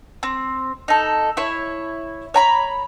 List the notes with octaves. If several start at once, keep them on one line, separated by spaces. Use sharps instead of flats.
C4
D#4 A4
E4 C#5
C#5 A#5 B5